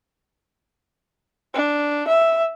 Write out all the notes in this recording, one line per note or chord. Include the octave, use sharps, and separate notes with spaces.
D4
E5